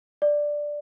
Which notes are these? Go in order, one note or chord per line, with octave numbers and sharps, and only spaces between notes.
D5